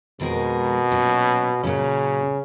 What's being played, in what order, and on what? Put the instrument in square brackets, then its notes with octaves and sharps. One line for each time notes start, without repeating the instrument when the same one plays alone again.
[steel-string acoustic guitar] F2 D#3 G#3 D#4 A#4 [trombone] B2
[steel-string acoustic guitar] A#2 F#3 C#4
[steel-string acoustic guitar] A#2 F#3 C#4 [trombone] C#3